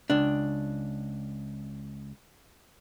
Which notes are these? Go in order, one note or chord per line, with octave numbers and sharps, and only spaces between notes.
C#2 D4